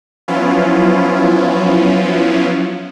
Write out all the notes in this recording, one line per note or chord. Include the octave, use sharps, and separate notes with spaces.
F3 F#3 B3 C#4 E4 F4